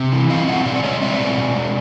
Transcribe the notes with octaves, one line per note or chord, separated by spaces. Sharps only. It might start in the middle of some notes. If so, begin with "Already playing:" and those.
Already playing: C3
E3
C4 D#5 F5
B2 E5 F#5
B2 D5 E5
D5
G#3 C#5 D#5
C4 D5 E5
B2
B2
G#3